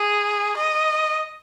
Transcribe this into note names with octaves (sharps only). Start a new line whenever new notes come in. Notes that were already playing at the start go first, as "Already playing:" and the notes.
Already playing: G#4
D#5